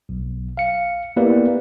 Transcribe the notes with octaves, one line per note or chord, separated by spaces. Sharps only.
B1
F5 C#7
A#3 B3 E4 G4 B4 D5